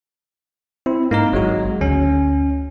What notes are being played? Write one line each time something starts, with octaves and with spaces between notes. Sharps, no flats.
C4 E4
G#2 A#3 D#4 A#4
G#1 F#3 G#3 F#4
D2 C#4